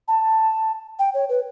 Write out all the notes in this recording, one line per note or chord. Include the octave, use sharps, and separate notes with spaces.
A5
G5
C#5
B4